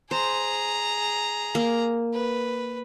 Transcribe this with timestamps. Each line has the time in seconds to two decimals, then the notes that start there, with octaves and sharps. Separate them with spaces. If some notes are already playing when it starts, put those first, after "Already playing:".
0.11 G#4 C5 A#5
1.55 A#3
2.13 B4